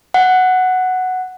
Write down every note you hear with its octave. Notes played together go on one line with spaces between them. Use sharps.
F#5